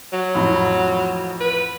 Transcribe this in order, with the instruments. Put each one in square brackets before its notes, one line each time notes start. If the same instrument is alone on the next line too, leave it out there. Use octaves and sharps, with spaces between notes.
[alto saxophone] F#3
[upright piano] A1 F2 B5
[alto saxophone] B4